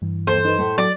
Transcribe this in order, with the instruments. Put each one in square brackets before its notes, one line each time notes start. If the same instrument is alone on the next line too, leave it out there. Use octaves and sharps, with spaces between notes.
[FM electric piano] G2 E3
[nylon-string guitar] D#2 A4 [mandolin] C5
[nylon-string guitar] D#4 B4
A2 A3
[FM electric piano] F#3 [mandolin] D5